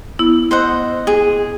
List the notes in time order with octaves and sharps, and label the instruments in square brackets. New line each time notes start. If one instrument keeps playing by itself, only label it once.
[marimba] B3 E4
[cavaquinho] C5 D#5 F#5
G#4